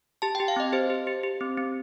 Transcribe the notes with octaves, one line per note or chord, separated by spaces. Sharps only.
G4 A5
G5
G4
F5
C4 D#5
G4 C5
G4
G4
G4
C4
C4